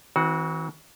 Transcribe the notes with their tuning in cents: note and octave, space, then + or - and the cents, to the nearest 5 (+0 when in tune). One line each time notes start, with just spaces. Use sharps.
E3 -45 C4 +0 F#4 +0